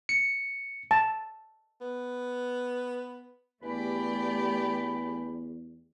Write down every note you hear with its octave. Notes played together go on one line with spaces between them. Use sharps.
C#7
A5
B3
E2 G2 A3 G4 D5 G#5 B5